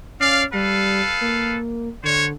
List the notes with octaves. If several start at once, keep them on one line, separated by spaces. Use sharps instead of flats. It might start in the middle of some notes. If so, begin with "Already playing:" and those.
C#4 D5 F5
G3 A4 B4 F5
A#3
D3 F#4 C5 C#5